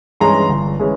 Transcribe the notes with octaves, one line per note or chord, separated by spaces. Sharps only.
G2 E3 G#3 C#4 A#5 C6
G1
E3 G#3 C#4